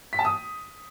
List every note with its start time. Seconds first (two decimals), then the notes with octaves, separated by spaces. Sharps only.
0.13 B6
0.19 A5
0.25 D#6